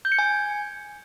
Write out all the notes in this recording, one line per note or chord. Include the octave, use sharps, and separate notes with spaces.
G6
C#7
G#5